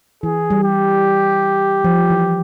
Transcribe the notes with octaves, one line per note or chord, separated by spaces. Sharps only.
E3 G#4
G3
G4
F3
E3